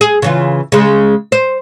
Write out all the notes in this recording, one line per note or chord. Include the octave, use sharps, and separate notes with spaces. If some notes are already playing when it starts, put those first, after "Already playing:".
G#4
C#3 E3 F4
C#3 G#3
C5